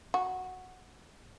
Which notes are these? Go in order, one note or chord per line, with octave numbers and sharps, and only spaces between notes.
F#4